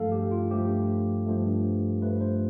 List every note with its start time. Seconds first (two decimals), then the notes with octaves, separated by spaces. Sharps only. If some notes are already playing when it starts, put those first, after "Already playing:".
Already playing: G2 F3 A3 A4 F5
0.12 G4
0.31 F4
0.51 G2 F3 A3 G4
1.26 G2 F3 A3
2.02 G2 F3 A3 B4
2.21 C5